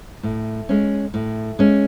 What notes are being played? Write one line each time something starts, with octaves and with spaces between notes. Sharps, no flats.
A2
G#3 C#4
A2
G#3 C#4